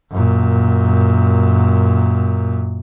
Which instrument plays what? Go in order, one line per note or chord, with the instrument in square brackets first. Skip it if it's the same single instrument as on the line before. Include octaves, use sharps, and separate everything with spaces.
[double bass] F#2 A#2